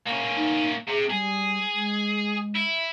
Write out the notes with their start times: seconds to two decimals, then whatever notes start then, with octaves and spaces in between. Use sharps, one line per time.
0.07 A#3 C#4
0.37 D#4
0.88 C3 G#4
1.11 G3 G#4
1.74 G#3
2.55 E4